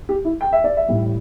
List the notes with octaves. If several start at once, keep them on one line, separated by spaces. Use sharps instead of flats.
G4
E4
G5
E5
D5
E5
A1 A2 G3